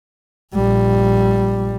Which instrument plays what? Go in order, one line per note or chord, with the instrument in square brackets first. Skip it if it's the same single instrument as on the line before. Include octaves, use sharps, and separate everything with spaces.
[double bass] A#1 G3